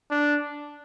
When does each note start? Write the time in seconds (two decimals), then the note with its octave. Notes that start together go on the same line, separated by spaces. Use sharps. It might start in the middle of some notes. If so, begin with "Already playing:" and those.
0.11 D4